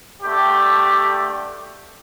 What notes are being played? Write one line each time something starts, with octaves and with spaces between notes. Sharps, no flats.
G2 D3 A3 G4